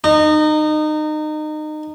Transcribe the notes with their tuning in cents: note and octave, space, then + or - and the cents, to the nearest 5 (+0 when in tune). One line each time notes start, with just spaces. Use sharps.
D#4 -25